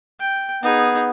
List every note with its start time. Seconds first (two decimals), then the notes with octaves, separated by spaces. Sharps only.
0.20 G5
0.63 B3 D#4 G#4